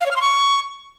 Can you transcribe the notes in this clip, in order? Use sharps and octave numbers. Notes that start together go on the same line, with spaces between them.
F5
C#5
F6
C6
C#6